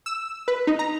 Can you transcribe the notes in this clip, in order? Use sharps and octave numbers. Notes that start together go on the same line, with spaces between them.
E6
B4
D#4
A#5